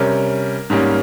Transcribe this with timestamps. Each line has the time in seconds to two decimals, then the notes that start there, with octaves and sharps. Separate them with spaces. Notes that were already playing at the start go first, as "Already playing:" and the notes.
Already playing: C3 G3 C#4 A#4
0.70 G#2 G3 A#3 C#4